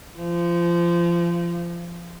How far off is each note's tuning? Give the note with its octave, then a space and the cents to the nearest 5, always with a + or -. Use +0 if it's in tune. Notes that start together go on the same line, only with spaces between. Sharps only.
F3 -25